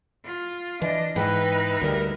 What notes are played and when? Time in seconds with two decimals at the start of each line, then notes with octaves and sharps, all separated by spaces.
0.25 F4
0.82 E3 D4 D#5
1.16 G#2 E3 D#4 E4 B4 G5
1.81 D2 F#3 G3 A#4